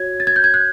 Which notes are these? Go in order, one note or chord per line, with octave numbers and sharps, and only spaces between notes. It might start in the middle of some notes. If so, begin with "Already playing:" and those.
Already playing: F#4 C#5 G#6
A6
G#6
G6
G#6
F#6